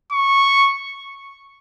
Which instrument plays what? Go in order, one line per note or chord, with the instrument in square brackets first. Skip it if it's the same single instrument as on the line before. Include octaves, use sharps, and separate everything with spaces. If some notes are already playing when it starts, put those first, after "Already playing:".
[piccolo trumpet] C#6